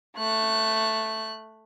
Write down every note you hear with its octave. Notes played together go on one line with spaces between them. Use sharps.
A3 F#6